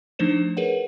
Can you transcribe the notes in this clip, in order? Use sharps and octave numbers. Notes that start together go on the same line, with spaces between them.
F3 A3 D4 D#4 C5 E7
G#4 A#4 B4 C#5 F#5